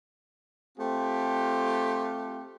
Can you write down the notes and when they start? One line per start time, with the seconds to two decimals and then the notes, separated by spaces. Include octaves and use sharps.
0.79 A3 C4 F4 G4